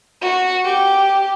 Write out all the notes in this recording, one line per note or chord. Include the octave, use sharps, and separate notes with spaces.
F#4
G4